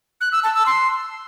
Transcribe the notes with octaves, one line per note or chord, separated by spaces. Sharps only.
F#6
E6
A5
E6
C6